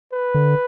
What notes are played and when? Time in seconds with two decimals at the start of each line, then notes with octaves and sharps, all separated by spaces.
0.12 B4
0.34 D3